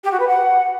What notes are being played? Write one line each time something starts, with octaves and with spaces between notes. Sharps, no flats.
G4
F#4
B4
F#5